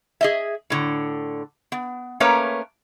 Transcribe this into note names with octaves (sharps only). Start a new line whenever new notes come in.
G#4 D#5 E5
A2 D3
B3
A3 A#3 C#4 A#4 B4 C#5